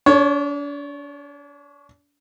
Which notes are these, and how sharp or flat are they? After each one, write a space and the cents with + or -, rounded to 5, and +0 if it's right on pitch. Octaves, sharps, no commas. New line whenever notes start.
D4 -40 C#5 +0